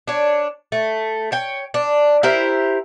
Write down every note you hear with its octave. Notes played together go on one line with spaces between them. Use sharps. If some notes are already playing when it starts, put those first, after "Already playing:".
D4 C#5
A3
C#5 G5
D4
E4 G4 A#4 C5